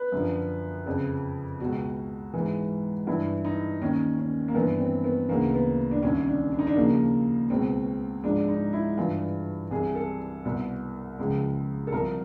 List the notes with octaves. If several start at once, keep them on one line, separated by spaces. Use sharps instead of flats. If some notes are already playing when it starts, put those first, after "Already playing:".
Already playing: B4
F#2 D3 F3
F2 C#3 F3
C#2 B2 F#4
G#2 E3
G2 E3 E4
D#4
D#2 D#3 C#4
C#4
A#3
G2 E3 B3
C4
B3
D2 C#3 E3 A#3
B3
D4
C2 C3 D#3 C#4
D4
D4
D#4
D4
D#2 C#3 F3 A#3
C#2 B2 C4
G#2 F3 D4
D#4
E4
G2 E3 F4
C2 C3 E3 G#4
A4
C2 B2
C#2 C#3 F3
A4
C2 C3 F3 A#4